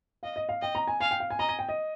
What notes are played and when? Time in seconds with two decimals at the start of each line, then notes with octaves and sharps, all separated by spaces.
0.23 D#5 F5
0.36 D#5
0.49 F5
0.62 D#5 G5
0.75 A#5
0.88 G#5
1.00 F5 G#5
1.11 G5
1.20 F5
1.30 G#5
1.39 D#5 A#5
1.49 G#5
1.59 G5
1.69 D#5